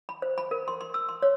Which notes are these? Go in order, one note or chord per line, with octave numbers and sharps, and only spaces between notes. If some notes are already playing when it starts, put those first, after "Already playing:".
B5
C5
B5
A#4
C6
C6
E6
C6
C#5